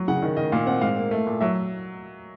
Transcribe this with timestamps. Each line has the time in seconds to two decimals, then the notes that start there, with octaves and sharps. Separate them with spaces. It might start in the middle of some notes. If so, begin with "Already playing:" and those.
Already playing: F#3
0.08 C#3 F#5
0.22 D#3
0.36 D#3 D#5
0.52 A#2 F5
0.66 C4 F#5
0.81 G#2 F5
0.97 A#3
1.11 A3
1.27 A#2
1.41 F#3 E5